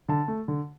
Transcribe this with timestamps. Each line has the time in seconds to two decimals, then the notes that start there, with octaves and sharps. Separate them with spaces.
0.09 D3 A5
0.28 A3
0.48 D3